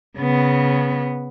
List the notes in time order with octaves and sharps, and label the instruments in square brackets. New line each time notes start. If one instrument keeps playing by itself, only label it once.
[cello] C#3 B3